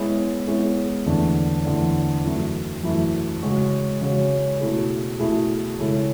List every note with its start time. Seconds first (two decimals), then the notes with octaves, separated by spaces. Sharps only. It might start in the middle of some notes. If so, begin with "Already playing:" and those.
Already playing: G#3 B3 E4 G#4 C#5
0.47 G#3 B3 E4 G#4 C#5
1.06 E2 D3 A3 D4
1.65 E2 D3 A3 D4
2.24 F#2 E3 A3 E4
2.83 F#2 E3 A3 E4
3.42 C#3 G#3 C#4 F#4
4.02 C#3 G#3 C#4 F#4
4.60 B2 A3 E4 G#4
5.20 B2 A3 E4 G#4
5.79 C#3 G#3 C#4 E4 A4